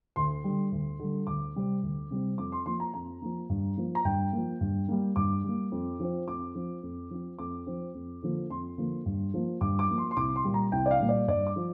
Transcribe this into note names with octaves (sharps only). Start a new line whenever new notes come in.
D2 C6
D3 G3
D2
D3 G3
D2 D6
C3 G3 C4
D2
C3 G3 C4
F2 D6
C6
F3 A#3 C6
A#5
F2 A#5
F3 A#3
G2
F3 A#3
A#5
G2 G5
F3 A#3
G2
G3 A#3
G2 D6
G3 A#3
F2
F3 C4
F2 D6
F3 C4
F2
F3 C4
F2 D6
F3 C4
F2
D3 F3 A#3
F2 C6
D3 F3 A#3
G2
F3 A#3
G2 D6
D6
F3 A#3
C6
C6
C2 D6
C6
A#2 G3 A#3
A#5
C2 G5
D5
F5
A#2 G3 A#3
D5
G2 D5
D6
F3